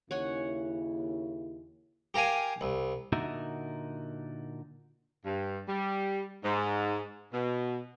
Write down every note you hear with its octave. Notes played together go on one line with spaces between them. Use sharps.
D#2 C#3 E4 C#5 F#5 G#5
G4 A#4 F5 G#5
C2
A#2 D3 D#4 F#4 A#4 E5
G2
G3
G#2
B2